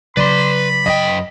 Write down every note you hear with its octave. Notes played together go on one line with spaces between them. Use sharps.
C#3 F#3 B4 D5 B5 C6
F#2 D#5 G5